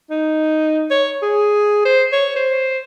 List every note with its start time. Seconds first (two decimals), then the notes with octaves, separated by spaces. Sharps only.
0.11 D#4
0.91 C#5
1.22 G#4
1.85 C5
2.13 C#5
2.36 C5